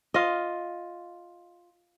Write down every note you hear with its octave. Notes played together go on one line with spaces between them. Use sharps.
F4 D#5